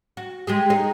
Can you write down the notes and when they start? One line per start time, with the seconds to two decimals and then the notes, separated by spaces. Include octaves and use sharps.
0.17 F#4
0.47 G#3 G4 G#4
0.70 D#4 G#4